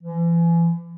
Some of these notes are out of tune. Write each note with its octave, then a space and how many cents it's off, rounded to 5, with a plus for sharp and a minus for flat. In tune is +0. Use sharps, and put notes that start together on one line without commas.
E3 +40